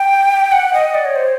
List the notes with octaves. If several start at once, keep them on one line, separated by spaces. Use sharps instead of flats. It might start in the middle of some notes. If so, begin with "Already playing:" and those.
Already playing: G5
F#5
D#5
D5
C#5
C5